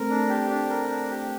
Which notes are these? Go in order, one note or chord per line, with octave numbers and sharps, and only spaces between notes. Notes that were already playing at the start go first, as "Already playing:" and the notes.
Already playing: A3 C4 A#4
D4
G4
D4
A#4
D4
G4